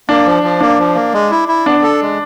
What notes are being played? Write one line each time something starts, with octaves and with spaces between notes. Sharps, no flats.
A#3 D4
F3
F3
A#3 D4
F3
A#3
G#3
E4
E4
B3 D4
A4
G#3